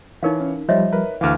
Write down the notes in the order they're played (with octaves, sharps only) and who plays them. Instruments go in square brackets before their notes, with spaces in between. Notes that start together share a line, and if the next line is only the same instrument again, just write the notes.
[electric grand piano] E3 C#5 [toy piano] D#4 A#4 F5
[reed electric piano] C#4
[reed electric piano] F3 G3 [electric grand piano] C5 [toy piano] C#5 D#5 E5
[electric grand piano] A#4 B4
[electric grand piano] D2 E3 [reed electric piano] F5 D6 F6